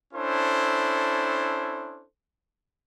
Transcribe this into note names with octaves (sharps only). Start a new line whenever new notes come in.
C#4 D4 E4 A4 C5